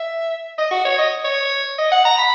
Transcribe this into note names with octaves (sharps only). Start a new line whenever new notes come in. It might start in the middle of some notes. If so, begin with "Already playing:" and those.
Already playing: E5
D#5
F#4
C#5
D#5
C#5
D#5
F#5
A#5
B5